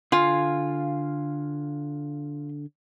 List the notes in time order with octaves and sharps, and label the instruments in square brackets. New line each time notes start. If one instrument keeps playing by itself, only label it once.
[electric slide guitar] D3 F5 G#5 [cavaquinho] F4